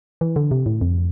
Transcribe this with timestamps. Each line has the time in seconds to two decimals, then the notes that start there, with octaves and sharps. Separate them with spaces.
0.21 E3
0.36 D3
0.51 C3
0.66 A2
0.81 F2